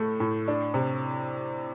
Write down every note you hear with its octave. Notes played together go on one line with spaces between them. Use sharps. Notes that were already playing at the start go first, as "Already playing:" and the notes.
Already playing: A2 A3 E4
A2
D4
C3